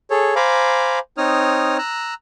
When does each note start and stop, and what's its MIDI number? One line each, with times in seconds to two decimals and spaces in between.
0.11 0.35 68
0.11 0.35 69
0.11 0.35 73
0.36 0.99 72
0.36 0.99 77
0.36 0.99 80
0.36 0.99 82
0.36 0.99 83
0.36 0.99 86
1.18 1.77 60
1.18 1.77 63
1.18 1.77 73
1.18 1.77 87
1.18 1.77 89
1.78 2.14 82
1.78 2.14 88
1.78 2.14 90